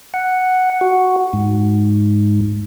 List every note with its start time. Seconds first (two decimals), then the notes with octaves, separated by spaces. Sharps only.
0.14 F#5
0.81 F#4
1.33 G#2